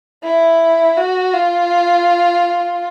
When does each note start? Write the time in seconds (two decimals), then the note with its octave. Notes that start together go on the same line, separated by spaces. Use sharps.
0.24 E4
0.97 F#4
1.33 F4